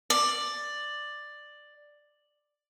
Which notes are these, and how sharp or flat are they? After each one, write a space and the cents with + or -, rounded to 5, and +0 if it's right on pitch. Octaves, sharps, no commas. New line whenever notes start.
D5 +10